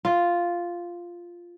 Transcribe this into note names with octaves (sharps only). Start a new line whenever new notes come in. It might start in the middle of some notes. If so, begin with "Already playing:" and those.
F4